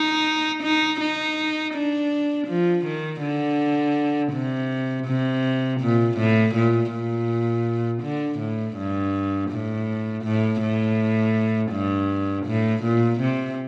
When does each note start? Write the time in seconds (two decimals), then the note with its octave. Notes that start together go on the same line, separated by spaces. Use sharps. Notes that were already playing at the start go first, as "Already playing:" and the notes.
Already playing: D#4
0.63 D#4
1.01 D#4
1.74 D4
2.48 F3
2.85 D#3
3.22 D3
4.33 C3
5.07 C3
5.81 A#2
6.18 A2
6.55 A#2
6.92 A#2
8.03 D3
8.39 A2
8.77 G2
9.51 A2
10.24 A2
10.62 A2
11.72 G2
12.47 A2
12.83 A#2
13.20 C3